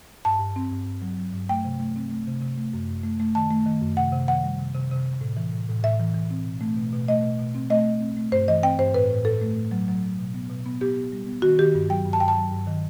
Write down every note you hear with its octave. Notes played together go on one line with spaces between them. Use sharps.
G2 A5
G2
C4
G2
G2
F#3
F#3
G2
A3 G5
C3
A3
C4
A3
C3
C3
A3
F#2
F#2
A3
A3
D#3 A5
A3
D#3
F#2
C3 F#5
C3
D#3 F#5
G3
C3
C3
C3
C3
A2
E3
A2
A2
A2 E5
E3
E3
C4
B2
A3
B2
B2
A3 D#5
B2
B2
C4
A3 D#5
A3
C4
A3
G2 C5
E3 D#5
C4 G5
G2 C5
A2 B4
A2
A2 A4
A3
A2
F#3
F#3
F#3
B2
B3
B2
B3
B3 G4
B3
G3
B3
D#3 F#4
D#3 G4
G2
F#3 G5
G2
A5
G2 G5
A5
F#3
G2
D#3